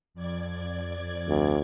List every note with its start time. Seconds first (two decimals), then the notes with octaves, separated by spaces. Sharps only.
0.14 F2 D5 G#6
1.29 D2